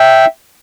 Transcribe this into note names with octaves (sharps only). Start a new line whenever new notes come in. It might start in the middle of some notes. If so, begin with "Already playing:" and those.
Already playing: E5 G5